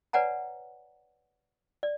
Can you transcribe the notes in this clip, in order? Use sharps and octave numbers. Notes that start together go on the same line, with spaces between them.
B4 C#5 D5 F#5 G#5 A#5
D5